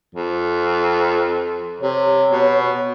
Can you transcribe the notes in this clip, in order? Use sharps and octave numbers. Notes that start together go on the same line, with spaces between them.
F2
C3 C#5
B2